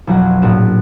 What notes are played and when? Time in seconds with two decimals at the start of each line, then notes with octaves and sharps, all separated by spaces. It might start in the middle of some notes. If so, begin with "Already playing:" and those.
0.07 B1 F2 F#3 F#5
0.42 A#1 A2 F#4 E7